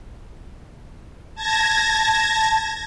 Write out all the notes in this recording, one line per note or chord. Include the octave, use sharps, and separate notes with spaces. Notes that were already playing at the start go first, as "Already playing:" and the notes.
A5 G#6 A#6